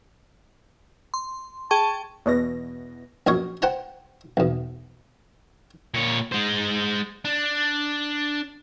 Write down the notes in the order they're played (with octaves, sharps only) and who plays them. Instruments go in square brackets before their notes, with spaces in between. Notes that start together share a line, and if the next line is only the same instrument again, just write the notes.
[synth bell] C6
[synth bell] G#4 G5 C#6 [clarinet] A5
[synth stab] E2 B2 A#6
[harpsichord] A#1 F#2 D#4 A#4 C#5
C5 F#5 G5 A5 A#5
B1 E2
[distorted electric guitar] A#2 C#5
G#3 C5
D4